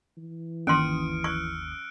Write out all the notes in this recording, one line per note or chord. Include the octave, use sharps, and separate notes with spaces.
E3
G1 D#2 C#4 C6 D#6 F6 C#7 D7
C#6 E6 F#6